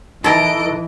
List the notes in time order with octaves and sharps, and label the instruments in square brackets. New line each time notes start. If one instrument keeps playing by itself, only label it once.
[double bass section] E3 [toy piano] D#4 [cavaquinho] A4 A#4 [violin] D#5 D7